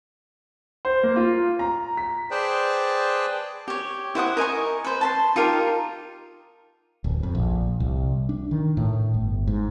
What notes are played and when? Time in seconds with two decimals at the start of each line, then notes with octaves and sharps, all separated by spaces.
0.85 C5
1.03 A#3
1.16 F4
1.59 A#5
1.97 B6
2.31 G#4 B4 C5 D5 G5 A5
3.68 G4 C#5
4.15 E4 C5 F#5 D#6
4.37 A#4 D#5 G#5 C#6
4.84 B4 C5
5.01 A5 B5 C6
5.36 D#4 F4 G4 A#4
7.04 D1
7.23 F2
7.35 A#1
7.80 C2
8.29 D4
8.51 D#3
8.77 A2
9.14 G1
9.47 G#2